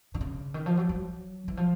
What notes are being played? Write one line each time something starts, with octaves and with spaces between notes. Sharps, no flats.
D3
C#3
D#3
F3
F#3
F#3
E3
F3